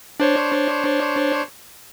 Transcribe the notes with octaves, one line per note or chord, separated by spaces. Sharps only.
D4 C5 C#5